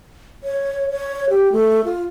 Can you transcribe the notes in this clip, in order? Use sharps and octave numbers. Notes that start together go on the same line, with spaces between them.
C#5
C#5
G4
A3
F4